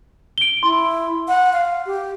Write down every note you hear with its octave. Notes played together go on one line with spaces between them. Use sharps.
D7 G7
E4 C6
F#5
F5
G4